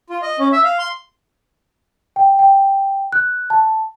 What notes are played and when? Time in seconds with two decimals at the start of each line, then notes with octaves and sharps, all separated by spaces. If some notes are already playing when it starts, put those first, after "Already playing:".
0.10 F4
0.22 D#5
0.39 C#4
0.52 E5
0.64 F5
0.79 C6
2.16 G5
2.39 G5
3.12 F#6
3.50 A5